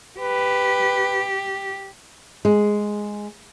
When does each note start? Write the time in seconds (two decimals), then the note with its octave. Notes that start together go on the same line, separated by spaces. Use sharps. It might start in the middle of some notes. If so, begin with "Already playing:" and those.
0.20 G4 B4
2.45 G#3